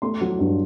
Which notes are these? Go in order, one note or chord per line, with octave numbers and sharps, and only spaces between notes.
A3 C6
F#3
G2